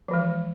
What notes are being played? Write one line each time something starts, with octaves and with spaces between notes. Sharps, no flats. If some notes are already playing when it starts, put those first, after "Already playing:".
E3 F3 G#3